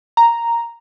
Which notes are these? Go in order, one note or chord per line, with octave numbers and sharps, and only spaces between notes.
A#5